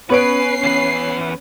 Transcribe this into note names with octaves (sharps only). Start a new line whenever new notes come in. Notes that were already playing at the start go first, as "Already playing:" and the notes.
B3 C#4 B4 C#5 C7 D7
E2 B4